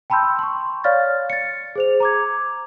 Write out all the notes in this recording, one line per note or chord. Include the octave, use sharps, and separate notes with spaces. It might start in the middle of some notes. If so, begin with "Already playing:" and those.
G5 A5 B5 C6 E6 G6
C6 C#6
C#5 D5 F5 F6 A6
A6 C#7
G#4 C5 F7
A#5 D6 G#6